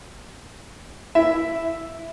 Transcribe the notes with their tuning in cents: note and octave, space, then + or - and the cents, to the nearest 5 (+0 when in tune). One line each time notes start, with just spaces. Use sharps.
E4 +15 E5 +0